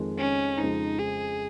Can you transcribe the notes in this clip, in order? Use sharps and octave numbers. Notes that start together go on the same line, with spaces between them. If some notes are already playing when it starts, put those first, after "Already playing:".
Already playing: F2 D#3 G#3
C#4
F2 C#3 G#3 C4 D#4
G#4